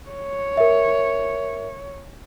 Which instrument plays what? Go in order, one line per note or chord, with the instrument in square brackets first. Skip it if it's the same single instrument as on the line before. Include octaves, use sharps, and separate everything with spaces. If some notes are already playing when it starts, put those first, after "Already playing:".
[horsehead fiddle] C#5
[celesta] A#4 E5